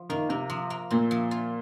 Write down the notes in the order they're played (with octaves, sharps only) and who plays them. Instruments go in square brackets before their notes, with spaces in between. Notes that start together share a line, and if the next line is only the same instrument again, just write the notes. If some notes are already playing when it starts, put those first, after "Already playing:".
Already playing: [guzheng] F3
[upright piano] D#3 [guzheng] A#3
[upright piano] C3 [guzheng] A#3
[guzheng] F3
A#3
[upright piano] A#2 [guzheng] C4
[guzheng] F3
F4